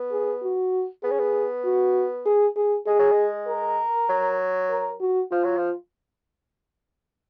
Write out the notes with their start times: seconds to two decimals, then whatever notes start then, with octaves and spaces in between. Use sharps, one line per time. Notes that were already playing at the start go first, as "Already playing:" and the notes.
Already playing: B3
0.11 G#4
0.42 F#4
1.03 B3 G#4
1.11 C#4
1.19 B3
1.64 F#4
2.25 G#4
2.56 G#4
2.87 G#3 G#4
2.99 F#3
3.12 G#3
3.48 A#4
4.09 F#3
4.70 A#4
5.00 F#4
5.31 F3 F4
5.44 F#3
5.57 F3